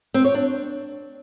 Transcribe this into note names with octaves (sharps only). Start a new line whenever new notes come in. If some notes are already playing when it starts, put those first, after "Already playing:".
C4
C#5
D4